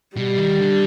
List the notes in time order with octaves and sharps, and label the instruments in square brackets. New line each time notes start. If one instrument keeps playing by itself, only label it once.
[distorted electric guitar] B2 [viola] G3
[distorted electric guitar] D#3
D3